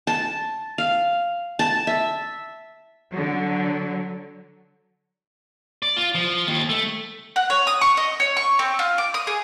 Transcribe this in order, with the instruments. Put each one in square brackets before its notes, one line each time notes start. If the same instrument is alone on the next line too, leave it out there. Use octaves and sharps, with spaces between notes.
[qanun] A5
F5
A5
E5
[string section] D3 F#3
[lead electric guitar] D5
F4
F3
D#2
A3
[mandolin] F#5
C#5
D#6
C#6
D#5
C#5
C#6
C4
F4
D6
D#6
G#4